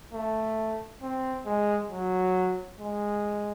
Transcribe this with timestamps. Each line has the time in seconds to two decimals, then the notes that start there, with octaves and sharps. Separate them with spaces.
0.13 A3
1.02 C4
1.46 G#3
1.91 F#3
2.80 G#3